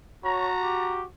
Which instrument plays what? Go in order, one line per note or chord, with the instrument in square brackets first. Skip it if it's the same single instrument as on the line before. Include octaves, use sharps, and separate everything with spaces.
[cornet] F#4 [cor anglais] C#5 [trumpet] A#5
[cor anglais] G4